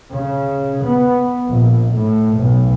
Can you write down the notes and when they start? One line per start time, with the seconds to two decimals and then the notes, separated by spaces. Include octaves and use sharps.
0.11 C#3
0.83 B3
1.49 A#1
1.93 A2
2.37 B1